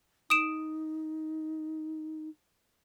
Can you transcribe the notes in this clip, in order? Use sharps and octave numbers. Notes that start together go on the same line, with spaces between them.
D#4 D#6 D7 E7